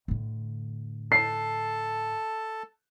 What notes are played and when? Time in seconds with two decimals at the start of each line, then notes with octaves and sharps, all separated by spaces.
0.08 A2 D3
1.12 A4 A5 C7